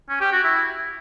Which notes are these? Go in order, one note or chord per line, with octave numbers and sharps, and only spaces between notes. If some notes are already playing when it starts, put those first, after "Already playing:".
C#4
G4
F#4
E4